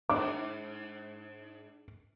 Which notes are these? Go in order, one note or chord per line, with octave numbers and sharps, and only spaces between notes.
G#2 D4 D6